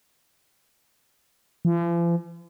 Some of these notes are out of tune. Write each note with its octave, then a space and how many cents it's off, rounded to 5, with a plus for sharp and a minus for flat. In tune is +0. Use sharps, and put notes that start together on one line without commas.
F3 -45